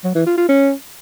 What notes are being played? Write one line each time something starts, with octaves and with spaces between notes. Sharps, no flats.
F#3
E3
F4
F4
C#4